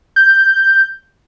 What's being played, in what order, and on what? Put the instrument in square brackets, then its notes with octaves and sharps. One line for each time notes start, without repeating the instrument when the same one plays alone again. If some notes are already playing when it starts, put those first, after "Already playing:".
[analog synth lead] G6